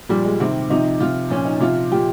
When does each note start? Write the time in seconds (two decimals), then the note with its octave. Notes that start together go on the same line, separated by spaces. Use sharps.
0.09 A#2 F3 G3
0.25 G#3
0.40 C3 D#3 C4
0.70 C3 F3 D#4
1.00 C3 F3 F4
1.30 A#2 F3 C#4
1.45 D#4
1.60 C3 F3 F4
1.91 A#2 F3 G4